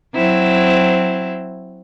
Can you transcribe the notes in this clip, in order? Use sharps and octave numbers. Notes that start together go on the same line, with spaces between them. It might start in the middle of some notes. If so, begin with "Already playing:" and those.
F#3 C4 E4